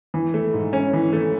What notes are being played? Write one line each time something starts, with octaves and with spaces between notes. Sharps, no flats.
E3
A3
G#2
C#4
E3
A3